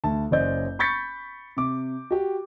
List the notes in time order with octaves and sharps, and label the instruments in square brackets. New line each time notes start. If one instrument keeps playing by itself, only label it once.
[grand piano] D2 A5
F#1 C#4 C5 D5 D#5 G6
B5 C#6 G6 A6 B6 C#7
C3 D6
F#4 G4